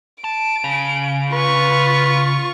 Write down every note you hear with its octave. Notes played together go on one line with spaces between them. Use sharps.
A5 D7
C#3
F4 B4 C#6